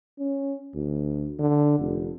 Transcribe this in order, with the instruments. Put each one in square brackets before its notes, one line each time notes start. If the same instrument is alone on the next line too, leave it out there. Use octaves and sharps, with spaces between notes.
[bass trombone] C#4
D2
D3
F1